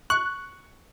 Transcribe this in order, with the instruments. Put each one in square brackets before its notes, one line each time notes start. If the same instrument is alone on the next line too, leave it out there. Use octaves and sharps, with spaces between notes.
[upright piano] C#6 [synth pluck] F#6